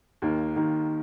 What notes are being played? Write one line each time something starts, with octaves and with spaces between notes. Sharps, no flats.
D#2 D#3 A#3 D#4
D#2 D#3 A#3 D#4